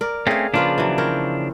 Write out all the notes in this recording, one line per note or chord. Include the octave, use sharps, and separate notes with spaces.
A#4 D5
A3 C4 C#4 G#4 F5
C#3 F3 A#3 D4 F4 B4
E3 F#3
C4 A#4 C#5